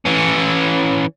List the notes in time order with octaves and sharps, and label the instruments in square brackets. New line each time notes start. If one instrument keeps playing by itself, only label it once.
[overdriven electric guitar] E3 C#4